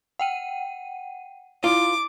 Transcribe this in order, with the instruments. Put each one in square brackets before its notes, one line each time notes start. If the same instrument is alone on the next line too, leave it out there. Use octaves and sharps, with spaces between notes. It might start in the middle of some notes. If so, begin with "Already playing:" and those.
[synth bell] F#5 G5 D#7
[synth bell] E4 [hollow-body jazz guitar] F4 [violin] D6